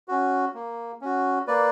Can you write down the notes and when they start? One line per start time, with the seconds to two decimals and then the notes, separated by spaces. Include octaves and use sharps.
0.08 C#4 F#4
0.55 A#3
1.01 C#4 F#4
1.47 A#3 B4 D5